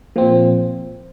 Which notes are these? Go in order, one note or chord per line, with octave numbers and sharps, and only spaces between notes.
A#2 F3 C4